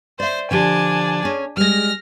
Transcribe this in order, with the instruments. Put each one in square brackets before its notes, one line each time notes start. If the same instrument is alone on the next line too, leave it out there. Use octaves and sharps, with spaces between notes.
[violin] C5 [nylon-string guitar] D5 E5
[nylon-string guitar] D3 F3 G4 [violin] D4 G#5
[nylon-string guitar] C#4 G#4
[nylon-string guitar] G3 G#3 [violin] F6 A#6